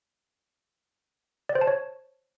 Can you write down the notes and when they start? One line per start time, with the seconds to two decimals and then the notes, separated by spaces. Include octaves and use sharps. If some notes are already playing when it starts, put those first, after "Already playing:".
1.49 D5
1.55 C5
1.61 A5
1.67 C#5